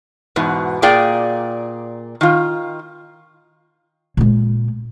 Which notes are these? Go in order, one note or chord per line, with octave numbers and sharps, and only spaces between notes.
E2 G#2 B2
A#2 A#3 G#4 D5 G5
D#3 F4
A#2 G#3